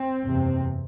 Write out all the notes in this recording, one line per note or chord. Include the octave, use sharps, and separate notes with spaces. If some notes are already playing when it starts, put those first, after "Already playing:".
Already playing: C4
F#1 E2 C3